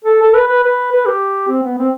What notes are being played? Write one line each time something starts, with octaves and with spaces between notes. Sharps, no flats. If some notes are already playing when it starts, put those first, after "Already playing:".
A4
A4
B4
B4
B4
B4
G4
C4
B3
C4